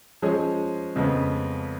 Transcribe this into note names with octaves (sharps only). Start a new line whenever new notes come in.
F3 G#3 C#4 G#4
F2 C#3 G#3 B3